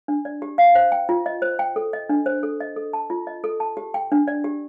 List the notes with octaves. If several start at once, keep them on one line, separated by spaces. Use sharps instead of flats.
D4
D5
G4
F5
C5
G5
F4
D#5
C5
G5
A4
D#5
D4
C5
A4
D#5
A4
A5
F4
D#5
A4
A5
G4
G5
D4
D5
G4